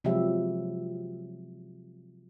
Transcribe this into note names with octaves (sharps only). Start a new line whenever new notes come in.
C3 F3 F#3 G#3 G4 E5